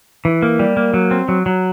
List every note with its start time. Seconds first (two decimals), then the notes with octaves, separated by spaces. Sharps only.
0.25 E3
0.42 A#3
0.59 G3
0.77 A#3
0.94 F#3
1.11 C4
1.28 F#3
1.46 F#3